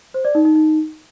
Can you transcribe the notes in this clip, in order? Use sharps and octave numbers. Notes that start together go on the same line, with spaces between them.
C5
D5
D#4
D#4
D#4